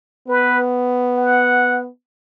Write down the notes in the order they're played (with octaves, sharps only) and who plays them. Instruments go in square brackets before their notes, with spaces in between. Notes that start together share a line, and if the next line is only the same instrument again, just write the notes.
[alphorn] B3 [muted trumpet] B4
[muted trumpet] F#5